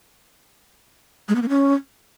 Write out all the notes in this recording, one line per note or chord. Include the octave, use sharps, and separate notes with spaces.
G#3
B3
A#3
C#4